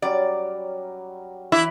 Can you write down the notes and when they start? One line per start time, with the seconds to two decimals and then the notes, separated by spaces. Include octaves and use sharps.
0.02 F#3 G3 C#4 D5
1.52 E3 E4